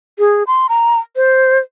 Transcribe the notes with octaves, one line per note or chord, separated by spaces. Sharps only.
G#4
C6
A#5
C5